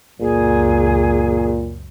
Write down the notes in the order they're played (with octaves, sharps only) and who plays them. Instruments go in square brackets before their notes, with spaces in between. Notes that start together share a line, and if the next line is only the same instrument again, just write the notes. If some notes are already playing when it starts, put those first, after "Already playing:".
[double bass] C#2 F#2 [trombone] A#2 [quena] G#4